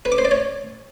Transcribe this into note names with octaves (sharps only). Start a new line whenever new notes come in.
B4
D6
C5
D5
C#5